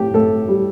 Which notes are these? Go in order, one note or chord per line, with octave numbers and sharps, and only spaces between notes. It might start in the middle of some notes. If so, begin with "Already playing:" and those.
Already playing: A2 G4
A2 A4
G3